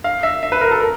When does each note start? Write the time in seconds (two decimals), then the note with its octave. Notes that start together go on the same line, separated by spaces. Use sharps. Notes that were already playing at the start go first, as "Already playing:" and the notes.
0.04 F5
0.23 E5
0.43 E5
0.52 B4
0.61 A#4
0.71 A4
0.80 A#4